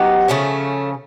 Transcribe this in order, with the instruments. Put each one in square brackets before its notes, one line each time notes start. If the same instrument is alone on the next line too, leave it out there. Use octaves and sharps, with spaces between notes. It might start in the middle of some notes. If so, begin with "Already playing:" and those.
Already playing: [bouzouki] F#3 B3 D#4 G4
C#3 F3 A3 C#4